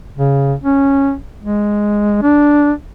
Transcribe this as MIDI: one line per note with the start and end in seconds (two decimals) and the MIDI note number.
0.18 0.54 49
0.64 1.14 61
1.42 2.20 56
2.22 2.72 62